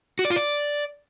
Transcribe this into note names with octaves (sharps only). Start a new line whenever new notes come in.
F#4
D5
F4
D5